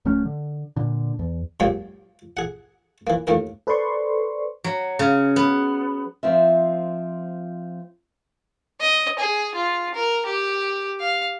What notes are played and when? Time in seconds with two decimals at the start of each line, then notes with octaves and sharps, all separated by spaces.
0.05 D1 F#3 A3 C#4
0.25 D3
0.76 A#2 D3
1.19 E2
1.60 A#2 F#3 G#3 A#3 C4 G4
2.37 G#4 F#5
3.07 E3 A#3
3.27 D#2 A2 A#3 A#4
3.67 A4 B4 C5 D5 C6 C#6
4.64 F#3
4.99 C#3
5.36 B3
6.23 F3 C4 F4 E5
8.81 D#5
9.19 G#4
9.56 F4
9.95 A#4
10.26 G4
11.00 F5